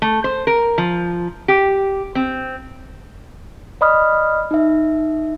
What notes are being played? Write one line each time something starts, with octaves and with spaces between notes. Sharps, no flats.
A3
C5
A#4
F3
G4
C4
D5 D#5 B5 D#6 F6
D#4 E5